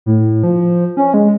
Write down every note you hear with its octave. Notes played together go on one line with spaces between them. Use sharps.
A2
F3
C#4
G#3